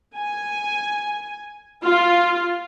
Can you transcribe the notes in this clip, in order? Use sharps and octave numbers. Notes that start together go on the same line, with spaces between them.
G#5
F4